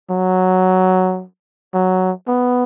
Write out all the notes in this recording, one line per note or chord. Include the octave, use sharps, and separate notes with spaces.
F#3
F#3
B3